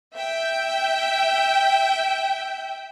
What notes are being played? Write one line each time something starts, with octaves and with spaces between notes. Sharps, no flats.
E5 G5 G6